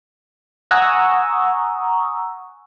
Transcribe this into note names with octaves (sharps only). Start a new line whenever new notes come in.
F#5 G#5 A#5 C#6 D#6 E6